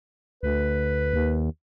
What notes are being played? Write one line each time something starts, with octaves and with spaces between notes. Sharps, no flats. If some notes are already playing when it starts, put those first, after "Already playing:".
D2 B4
D#2